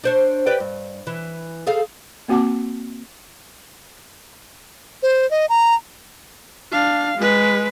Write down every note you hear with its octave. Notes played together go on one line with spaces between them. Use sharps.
D4 C5 C#5
G4 B4 D5
G2
E3
G#4 A4 F5
A#3 C4 F#4 F#5 A5 D6
C5
D#5
A#5
D4 F5
G#3 B4